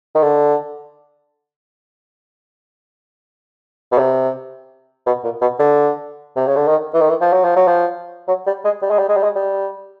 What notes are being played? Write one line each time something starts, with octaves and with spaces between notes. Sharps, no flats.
D#3
D3
B2
C3
B2
A#2
B2
D3
C3
C#3
D3
D#3
E3
D#3
E3
F3
F#3
F3
F#3
F3
F#3
G3
G#3
G3
G#3
G3
G#3
G3
G#3
G3